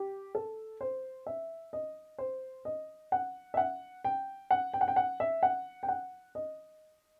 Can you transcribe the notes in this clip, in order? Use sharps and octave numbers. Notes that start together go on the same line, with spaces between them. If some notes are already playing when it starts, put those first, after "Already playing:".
Already playing: G4
A4
C5
E5
D#5
C5
D#5
F#5
E5
F#5
G5
F#5
G5
F#5
G5
F#5
E5
F#5
G5
F#5
D#5